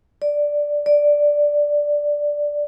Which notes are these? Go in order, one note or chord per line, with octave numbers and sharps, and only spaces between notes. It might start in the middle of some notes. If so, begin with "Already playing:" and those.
D5
D5